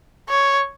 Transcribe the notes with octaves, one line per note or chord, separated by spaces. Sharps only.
C#5